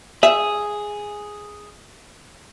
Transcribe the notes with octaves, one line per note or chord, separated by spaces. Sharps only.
G#4 E5